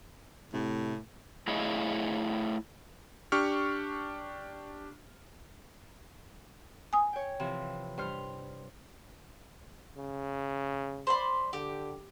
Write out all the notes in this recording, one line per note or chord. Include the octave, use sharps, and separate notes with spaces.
A2 C3
A3 E4 G#4 C#5 D#5 F5
D4 G4 C#6 F6
G#5 D#6
C#5 G5
C3 E3 F3
G2 C5 F6
C#3
C5 D5 B5
D3 G4